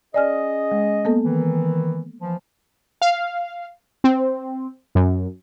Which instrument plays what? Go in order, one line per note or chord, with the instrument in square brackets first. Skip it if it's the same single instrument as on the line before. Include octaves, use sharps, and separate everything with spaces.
[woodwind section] C#4 G#4 D#5 [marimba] D5 G#5 F6
[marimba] G#3
A#3 B3 A4
[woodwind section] D#3 E3
E3 F3
[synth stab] F5
C4
F#2